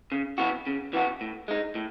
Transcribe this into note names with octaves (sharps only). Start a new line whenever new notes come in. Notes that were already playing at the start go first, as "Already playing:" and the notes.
C#3
E3 B3 F#4
C#3
E3 B3 F#4
A2
G#3 D#4
A2